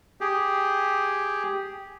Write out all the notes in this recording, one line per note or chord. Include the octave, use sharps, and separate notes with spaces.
G4 G#4